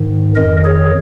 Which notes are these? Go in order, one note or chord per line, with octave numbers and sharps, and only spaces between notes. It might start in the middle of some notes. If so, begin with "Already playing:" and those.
Already playing: G#2 D#3
F2 D#3 A#4 D#5
G#4 C#5